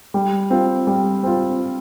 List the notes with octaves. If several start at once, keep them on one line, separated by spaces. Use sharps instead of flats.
G3
C4 F4
G3
C4 F4